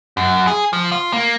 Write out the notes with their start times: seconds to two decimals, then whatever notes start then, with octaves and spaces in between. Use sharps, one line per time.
0.17 F#2
0.47 G#4
0.73 F3
0.92 F4
1.13 A#3